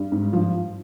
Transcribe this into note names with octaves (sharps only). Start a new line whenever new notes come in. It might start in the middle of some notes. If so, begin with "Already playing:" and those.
Already playing: G2
G#2
F3